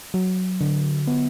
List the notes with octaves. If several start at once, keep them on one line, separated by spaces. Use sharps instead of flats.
F#3
D3
B3